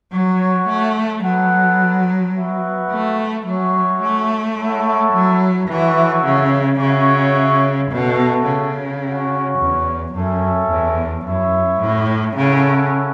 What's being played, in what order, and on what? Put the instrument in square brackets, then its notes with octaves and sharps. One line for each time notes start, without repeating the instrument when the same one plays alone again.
[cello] F#3 [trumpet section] F#4 C#5 F#5
[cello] A3
[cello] F#3 [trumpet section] B3 A4 F#5
[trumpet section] B3 F#4 B4 E5
[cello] A3
[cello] F#3 [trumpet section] C#4 F#4 C#5 E5
[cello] A3
[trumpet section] E4 A4 C#5 F#5
[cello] F#3
[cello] E3 [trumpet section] A3 F#4 C#5 E5
[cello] C#3
[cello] C#3 [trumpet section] F#4 C#5 E5
[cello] B2 [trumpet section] A3 F#4 A4
[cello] C#3
[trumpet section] C#4 F#4 C#5
[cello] E2
[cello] F#2 [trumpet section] C#4 A4 E5
[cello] E2
[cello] F#2 [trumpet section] E4 C#5 E5
[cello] A2
[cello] C#3 [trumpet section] C#4 E4 A4 F#5